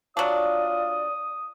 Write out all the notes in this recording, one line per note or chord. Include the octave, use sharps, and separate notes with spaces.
F#3 D4 F4 D5 D#6